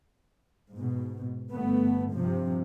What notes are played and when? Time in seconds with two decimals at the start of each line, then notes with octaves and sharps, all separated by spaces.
0.74 G#2 B2
1.49 G1 A3 B3
2.13 G2 C3 F3